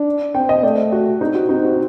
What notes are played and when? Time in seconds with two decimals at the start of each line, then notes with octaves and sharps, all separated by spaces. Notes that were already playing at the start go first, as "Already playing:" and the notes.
Already playing: D4
0.35 C4 G5
0.49 D#5
0.63 A3 D5
0.92 F#4
1.21 C4 D#4
1.35 F#4
1.49 C4 D#4
1.64 F#4